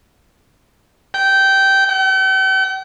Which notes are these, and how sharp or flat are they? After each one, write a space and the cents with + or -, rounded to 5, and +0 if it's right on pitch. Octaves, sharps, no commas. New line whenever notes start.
G5 -15
G5 -45